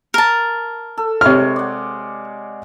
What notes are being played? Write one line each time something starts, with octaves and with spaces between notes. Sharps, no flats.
A#4 A5
A4
C3 G#3 C#5 F6
D5 F#5